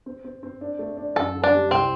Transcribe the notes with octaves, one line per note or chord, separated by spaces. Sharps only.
C4
C4
C4
D4
A3
D4
F#2 A4
D3
D4
G3
C2 C4